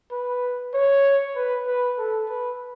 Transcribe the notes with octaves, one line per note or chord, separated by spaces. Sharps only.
B4
C#5
B4
B4
A4
B4